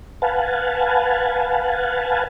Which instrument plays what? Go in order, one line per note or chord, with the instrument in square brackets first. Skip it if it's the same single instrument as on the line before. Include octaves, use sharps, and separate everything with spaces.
[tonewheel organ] B4 F5 F#5 G#5 A5